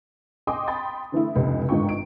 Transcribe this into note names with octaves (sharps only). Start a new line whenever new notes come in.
D#5 G5 G#5 C6 D6 D#6
G5 B5 C6 A6
D3 E3 A3 E4
F1 C#2 B3 G4
G1 G#2 D#3 F4 G5 C#6
D7